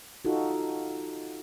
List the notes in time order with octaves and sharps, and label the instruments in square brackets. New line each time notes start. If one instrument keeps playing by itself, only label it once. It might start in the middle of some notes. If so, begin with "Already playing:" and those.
[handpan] D#4 F4 F#4 A4